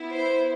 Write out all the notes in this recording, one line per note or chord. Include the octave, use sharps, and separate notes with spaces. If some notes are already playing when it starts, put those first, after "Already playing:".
Already playing: B3 E4
C5